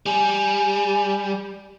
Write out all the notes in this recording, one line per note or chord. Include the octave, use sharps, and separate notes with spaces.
G3 G#5